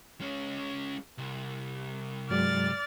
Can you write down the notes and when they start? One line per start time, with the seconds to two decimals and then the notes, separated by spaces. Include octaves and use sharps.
0.20 G#3 C#4
1.18 C2
2.30 G2 F#3 G#3 D5 F6 A6